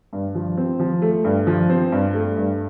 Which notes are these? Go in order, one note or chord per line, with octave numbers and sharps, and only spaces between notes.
G2
F3
C4
F3
A3
G2
F3
C4
G2
A3
G2